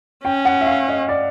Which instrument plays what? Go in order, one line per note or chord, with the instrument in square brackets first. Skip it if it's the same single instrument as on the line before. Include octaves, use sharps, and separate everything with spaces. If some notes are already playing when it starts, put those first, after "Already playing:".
[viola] C#4 [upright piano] G5
[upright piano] F#5
E5
F5
D#5
D5